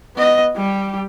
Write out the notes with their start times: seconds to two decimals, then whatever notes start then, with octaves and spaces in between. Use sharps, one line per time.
0.16 B3 D#5
0.55 G3 G4